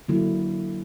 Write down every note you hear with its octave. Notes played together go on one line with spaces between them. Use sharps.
D3 F#3 A#3 E4